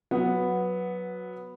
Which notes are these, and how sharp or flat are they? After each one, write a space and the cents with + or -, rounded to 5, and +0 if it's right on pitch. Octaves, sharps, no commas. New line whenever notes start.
F#3 -10 B3 +0 F#5 -5